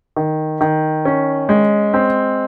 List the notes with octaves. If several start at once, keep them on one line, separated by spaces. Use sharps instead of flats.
D#3
D#3
C#4
G#3
C4